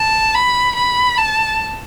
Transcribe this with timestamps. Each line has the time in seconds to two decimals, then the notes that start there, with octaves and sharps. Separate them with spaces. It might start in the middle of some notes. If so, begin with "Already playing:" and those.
Already playing: A5
0.35 B5
0.75 B5
1.18 A5